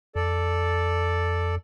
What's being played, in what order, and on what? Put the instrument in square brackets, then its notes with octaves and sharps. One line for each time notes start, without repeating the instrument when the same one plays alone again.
[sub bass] F2 [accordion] A4 D5